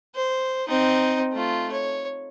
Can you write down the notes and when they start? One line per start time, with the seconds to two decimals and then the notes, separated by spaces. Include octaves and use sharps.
0.15 C5
0.68 C4 D#4
1.32 A3 F4
1.72 C#5